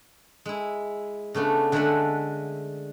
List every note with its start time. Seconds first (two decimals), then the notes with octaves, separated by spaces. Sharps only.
0.46 G#3 E4
1.35 C#3 A3 B3 D4
1.72 D3 G#3 A3 A#4 E5 F#5